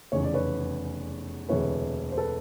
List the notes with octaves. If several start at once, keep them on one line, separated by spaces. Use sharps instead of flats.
F1 E2 C#3 C#5
D5
B4 C#5
E1 D2 C3 E3 B4 C#5
C5
A4 B4